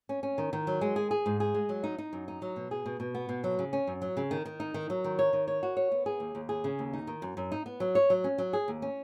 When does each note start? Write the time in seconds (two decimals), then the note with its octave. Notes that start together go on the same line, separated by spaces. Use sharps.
0.09 C#4
0.23 C#4
0.38 D#3
0.53 D#3
0.67 F#3
0.81 G#3
0.96 G#4
1.11 G#4
1.26 G#2
1.40 G#4
1.54 G#3
1.69 F#3
1.84 D#4
1.98 D#4
2.13 F#2
2.28 D#4
2.42 F#3
2.56 B2
2.71 G#4
2.86 B2
3.00 B2
3.15 B3
3.29 B2
3.44 F#3
3.59 C#3
3.73 C#4
3.87 F#2
4.02 F#3
4.17 C#3
4.31 D#3
4.45 D#3
4.60 D#4
4.74 D#3
4.90 F#3
5.04 D#3
5.19 C#5
5.33 D#3
5.48 C#5
5.63 F#4
5.77 C#5
5.92 B3
6.06 G#4
6.20 D#2
6.35 D#2
6.49 G#4
6.64 C#3
6.79 D#2
6.93 D#4
7.07 D#3
7.22 F#2
7.37 F#2
7.52 D#4
7.66 B3
7.80 F#3
7.95 C#5
8.10 F#3
8.24 C#4
8.38 F#3
8.53 G#4
8.68 D#2
8.82 C#4